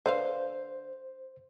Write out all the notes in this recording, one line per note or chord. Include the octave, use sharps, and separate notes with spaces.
D3 B4 C5 F5